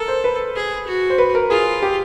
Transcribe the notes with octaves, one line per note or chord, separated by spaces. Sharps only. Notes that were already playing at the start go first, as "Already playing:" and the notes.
Already playing: A4 A#4
C5
B4
G#4
F#4
C5
B4
A#4
F4 G#4
G4